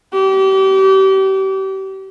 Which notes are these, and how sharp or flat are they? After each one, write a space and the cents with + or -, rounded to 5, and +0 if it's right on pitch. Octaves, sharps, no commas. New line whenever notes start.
G4 -35